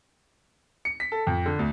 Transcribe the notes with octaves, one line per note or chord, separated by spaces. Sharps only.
C#7
B6
A4
F2
D3
D2